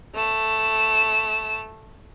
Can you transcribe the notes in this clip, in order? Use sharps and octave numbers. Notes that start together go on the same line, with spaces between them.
A3 E7